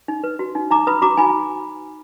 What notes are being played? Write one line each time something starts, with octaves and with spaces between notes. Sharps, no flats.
D#4
B4
F#4
D#4
D#4 A#5 D6
B4 B5 D#6
F#4 A#5 D6
D#4 G#5 B5